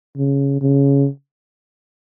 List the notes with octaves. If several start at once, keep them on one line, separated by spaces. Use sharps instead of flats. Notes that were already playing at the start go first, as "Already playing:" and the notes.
C#3
C#3